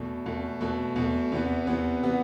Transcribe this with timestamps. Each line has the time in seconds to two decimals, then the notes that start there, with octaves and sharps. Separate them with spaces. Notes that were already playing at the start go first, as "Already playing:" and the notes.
Already playing: E2 B2 A3
0.26 E2 B2 A3
0.61 E2 B2 A3
0.96 E2 B2 A3
1.32 E2 C3 E3 B3
1.67 E2 C3 E3 B3
2.03 C3 E3 B3